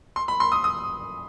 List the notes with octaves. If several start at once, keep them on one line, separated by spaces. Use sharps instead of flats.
C6
B5
C6
D#6
D#6